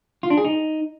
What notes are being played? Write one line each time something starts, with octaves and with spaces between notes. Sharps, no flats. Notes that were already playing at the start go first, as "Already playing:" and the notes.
F4
D4
G#4
D#4